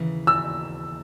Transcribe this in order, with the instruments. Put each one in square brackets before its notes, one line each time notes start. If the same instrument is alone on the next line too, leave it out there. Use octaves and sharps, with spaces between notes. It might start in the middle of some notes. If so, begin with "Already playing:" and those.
Already playing: [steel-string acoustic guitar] D#2 C#3 E3
[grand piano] E6